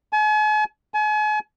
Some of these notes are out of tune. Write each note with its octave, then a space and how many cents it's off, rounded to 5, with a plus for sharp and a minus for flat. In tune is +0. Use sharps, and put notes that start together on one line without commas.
G#5 +45
G#5 +40